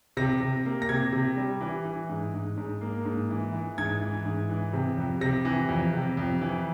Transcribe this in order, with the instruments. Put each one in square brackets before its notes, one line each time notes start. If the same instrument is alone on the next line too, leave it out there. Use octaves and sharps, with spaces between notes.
[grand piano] C3 A#6
C3
A#3
A#6
C3 G#6
C3
G3
E3
E3
G#2
G#2
G#2
A#3
G#2
E3
E3
G#2 G#6
E3
G#2
E3
C3
F2
C3 A#6
E3
F2
C3
F2
E3